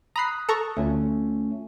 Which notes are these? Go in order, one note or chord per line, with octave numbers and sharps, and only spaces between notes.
A#5 B5 D#6 F#6 C7
A4 A#5 C#6
D2 A3 C#4 F4